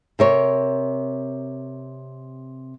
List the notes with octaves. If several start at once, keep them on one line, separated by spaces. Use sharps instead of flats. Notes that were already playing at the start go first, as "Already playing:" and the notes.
C3 A#4 C#5